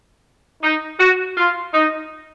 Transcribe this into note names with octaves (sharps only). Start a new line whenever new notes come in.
D#4
F#4
F4
D#4